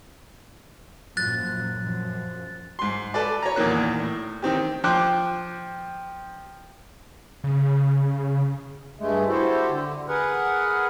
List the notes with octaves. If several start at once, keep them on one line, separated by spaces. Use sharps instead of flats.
F#2 A#2 F3 F#6 A6
F#2 F3
G#2 C6
A4 B4 D5
C#5 A#5
E2 A#2 D#3 A#3 F#6
A2
D#3 C4 G4
F3 C5 G5 D6 F#6
C#3
G2 G#3 A3
E4 F#4 G4 A4 C5
D3
G#4 A#4 B4 F#5